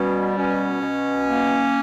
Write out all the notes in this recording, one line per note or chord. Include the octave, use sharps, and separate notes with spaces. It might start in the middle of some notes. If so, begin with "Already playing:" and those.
Already playing: B2 G3 C#4
B2 C#4
B2
A#3